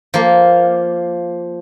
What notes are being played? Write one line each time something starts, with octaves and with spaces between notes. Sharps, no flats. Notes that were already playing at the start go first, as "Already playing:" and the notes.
F3 A#3